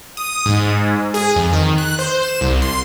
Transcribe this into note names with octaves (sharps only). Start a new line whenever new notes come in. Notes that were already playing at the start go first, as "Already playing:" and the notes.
D#6
G#2
G#4
F2
D#3
F#6
C5
E7
C2
C6